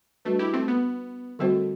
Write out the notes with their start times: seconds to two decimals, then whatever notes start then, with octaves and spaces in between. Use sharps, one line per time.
0.25 G3 A3 D4 F#4 B4
0.39 E4 G4
0.53 A3 C4
0.68 B3
1.39 D3 G3 A3 C4 F#4 C5